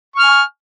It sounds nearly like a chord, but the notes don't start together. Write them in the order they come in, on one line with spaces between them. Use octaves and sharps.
C#6 F6 G#5